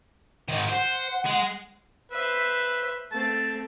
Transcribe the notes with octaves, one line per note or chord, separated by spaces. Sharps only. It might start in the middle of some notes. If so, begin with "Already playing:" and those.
G#2 D#3
C5 F#5
G#3
B4 C5 E5
A3 C4 A5